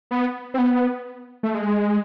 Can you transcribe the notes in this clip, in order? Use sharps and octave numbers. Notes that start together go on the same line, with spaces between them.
B3
C4
B3
A3
G#3